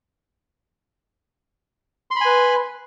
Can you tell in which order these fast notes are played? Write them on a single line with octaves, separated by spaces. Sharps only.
C6 B5 G#5 B4